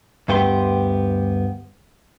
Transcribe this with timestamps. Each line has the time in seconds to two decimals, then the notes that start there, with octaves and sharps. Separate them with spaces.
0.28 D2 G2 B3 G4 E5 C6